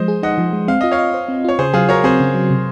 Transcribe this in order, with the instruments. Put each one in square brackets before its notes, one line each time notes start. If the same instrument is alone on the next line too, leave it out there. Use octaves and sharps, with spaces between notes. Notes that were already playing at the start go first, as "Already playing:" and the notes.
Already playing: [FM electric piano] F3 G#3 [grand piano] C5 D#5
[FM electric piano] G#4
[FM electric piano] D#4 [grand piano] D#5 F#5
[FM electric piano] F3
G#3
[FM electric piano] C4 [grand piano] F5
[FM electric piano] F4 [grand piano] D#5
[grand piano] C#5 F5
[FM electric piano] D#5
C5
C4
[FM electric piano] F4 [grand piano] C#5
[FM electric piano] C#3 [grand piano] G#4 C5
[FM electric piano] F#3 [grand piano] F4 G#4
[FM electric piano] F#4 [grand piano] A#4 C#5
[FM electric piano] C4 [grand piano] G#4 C5
[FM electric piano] C#3
F#3
C3